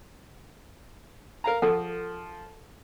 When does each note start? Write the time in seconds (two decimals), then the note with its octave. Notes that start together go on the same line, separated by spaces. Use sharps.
1.44 A#4 F5 A#5
1.62 F3 G#4 A4 F#5